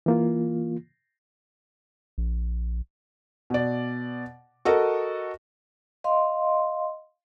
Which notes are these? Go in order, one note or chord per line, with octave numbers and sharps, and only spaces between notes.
E3 A#3 F4
A#1
B2 D5
F#4 A4 A#4 D#5
D#5 F5 C6